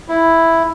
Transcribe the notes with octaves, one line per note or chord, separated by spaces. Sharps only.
E4